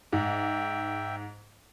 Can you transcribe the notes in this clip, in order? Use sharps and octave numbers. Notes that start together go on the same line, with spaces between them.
G#2 E5 G5